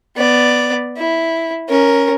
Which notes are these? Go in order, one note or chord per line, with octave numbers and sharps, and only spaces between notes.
B3 D5
E4
C#4 A#4